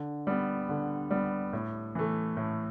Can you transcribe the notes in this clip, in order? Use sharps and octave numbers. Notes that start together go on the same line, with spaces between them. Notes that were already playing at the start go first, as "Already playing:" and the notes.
Already playing: D3
G3 B3
D3
G3 B3
A2
E3 A3
A2